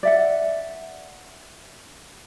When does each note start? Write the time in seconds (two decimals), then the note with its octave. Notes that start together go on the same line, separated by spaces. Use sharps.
0.03 D5 E5 F#5